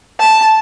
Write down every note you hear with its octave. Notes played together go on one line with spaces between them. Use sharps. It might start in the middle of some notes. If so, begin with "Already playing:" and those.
A5